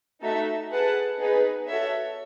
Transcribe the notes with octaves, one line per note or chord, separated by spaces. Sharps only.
A3 D#4 F#4 A4 E5
G#4 B4 F#5 A5
B3 D#4 G#4 B4
F#4 A4 C#5 E5